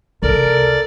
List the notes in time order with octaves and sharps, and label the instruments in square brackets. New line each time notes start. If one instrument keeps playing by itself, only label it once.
[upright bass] C2 [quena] A4 [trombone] A#4 [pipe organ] D5